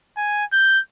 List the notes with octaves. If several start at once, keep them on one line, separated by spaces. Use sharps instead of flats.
G#5
G6